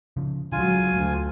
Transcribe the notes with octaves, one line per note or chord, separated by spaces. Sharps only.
C#3 F3
C#2 D3 F#3 F4 G#5
D2